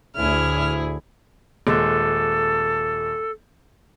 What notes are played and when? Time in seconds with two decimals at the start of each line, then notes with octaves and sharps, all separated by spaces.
0.16 D2 A2 E4 G#4 F6
1.67 D#1 G#3 A4